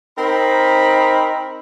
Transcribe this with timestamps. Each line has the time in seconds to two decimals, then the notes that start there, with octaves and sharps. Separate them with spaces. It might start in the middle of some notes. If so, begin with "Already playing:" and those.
0.18 C4 D#4 A#4 C5 B5